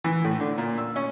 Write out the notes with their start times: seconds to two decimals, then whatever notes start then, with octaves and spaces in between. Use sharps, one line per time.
0.04 E3
0.24 A2
0.40 D3
0.58 A#2
0.78 E6
0.96 C#4